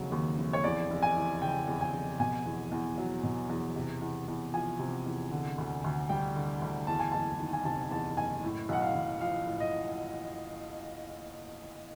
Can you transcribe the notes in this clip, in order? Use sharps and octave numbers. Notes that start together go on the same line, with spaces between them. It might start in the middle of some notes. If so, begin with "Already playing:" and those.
Already playing: F1 D#2 C#3 F#3
D#2
F1
C#5
E2 D5
F1
G#5
E3
C#3 G5
E2
G#5
F1
B2 G#5
E2
E2
F#3
B2
E2
C3
E2
E2
F3 G#5
C3
E2
D3
D2
D2
G3 G5
D3
D2
E2 A5
G#5
F#1 A5
D#3
G#5
C3 A5
E2 A5
F#1 G#5
A2
B1 F#5
F5
B1
F3 F5
A2
D#5